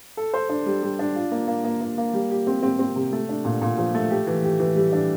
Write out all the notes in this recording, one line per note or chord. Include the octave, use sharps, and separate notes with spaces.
A4
C5
D4
G3
G3
D4
F4
A#3
A#3
A#3
A#3
A#3
G3
G4
C4
C4
C4
C3
A3
D4
A#2
A#2
F3
A3
G4
E3
G4
E3
G3
D4